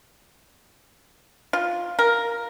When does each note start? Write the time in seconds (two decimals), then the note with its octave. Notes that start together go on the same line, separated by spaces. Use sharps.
1.53 F4
1.99 A#4